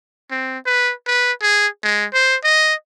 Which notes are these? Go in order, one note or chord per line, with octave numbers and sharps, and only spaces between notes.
C4
B4
B4
G#4
G#3
C5
D#5